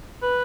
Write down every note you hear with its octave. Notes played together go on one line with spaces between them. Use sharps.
B4